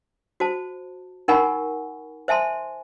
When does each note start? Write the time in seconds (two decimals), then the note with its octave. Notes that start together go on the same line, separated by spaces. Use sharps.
0.40 F#4 C5 A5
1.28 D#4 A#4 F#5 G#5 B5 C#6
2.28 C5 E5 G#5 A5 C6